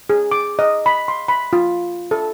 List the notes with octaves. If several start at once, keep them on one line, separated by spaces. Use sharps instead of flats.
G#4
D6
D#5
B5
C6
B5
F4
A4